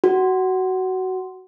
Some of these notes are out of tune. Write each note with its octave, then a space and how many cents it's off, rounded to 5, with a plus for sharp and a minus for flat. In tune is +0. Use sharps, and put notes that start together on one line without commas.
F#4 +15